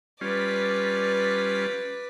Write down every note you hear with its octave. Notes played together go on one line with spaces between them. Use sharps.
G3 C#4 F4 B4 D5